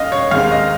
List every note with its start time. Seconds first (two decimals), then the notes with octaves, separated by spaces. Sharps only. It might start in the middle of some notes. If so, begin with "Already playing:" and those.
Already playing: D#2 D#5 F5
0.12 C#5
0.31 D#2 D#3 G#3 C4 F5
0.52 D#5